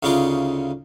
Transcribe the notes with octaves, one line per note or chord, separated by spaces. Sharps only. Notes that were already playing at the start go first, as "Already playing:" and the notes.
D2 C#3 C#4 D#4 F4 D6